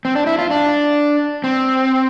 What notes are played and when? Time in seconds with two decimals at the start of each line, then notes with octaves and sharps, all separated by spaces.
0.05 C4
0.15 D4
0.27 E4
0.39 F4
0.51 D4
1.44 C4